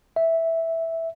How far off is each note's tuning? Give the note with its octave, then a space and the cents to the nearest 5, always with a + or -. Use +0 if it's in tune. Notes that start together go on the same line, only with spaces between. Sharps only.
E5 -5